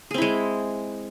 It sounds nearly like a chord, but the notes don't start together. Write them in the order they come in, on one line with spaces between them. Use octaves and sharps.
G#4 C4 E4 G#3